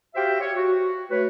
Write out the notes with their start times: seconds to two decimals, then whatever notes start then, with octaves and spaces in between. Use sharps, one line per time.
0.15 F#4 G4 C5 E5 F5 G5
0.40 C#5
0.56 F#4
1.11 A3 B4 C#5